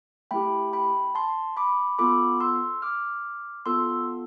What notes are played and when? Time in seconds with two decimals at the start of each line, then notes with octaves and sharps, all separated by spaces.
0.31 A3 E4 G4 G5 B5
0.73 G5 B5
1.15 A5 C6
1.57 B5 D6
1.99 B3 F4 A4 B5 D6
2.40 C6 E6
2.82 D6 F6
3.66 B3 F4 A4 C6 E6